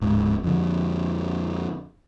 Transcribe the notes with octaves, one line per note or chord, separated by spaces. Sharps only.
D1 G#2
F2 D3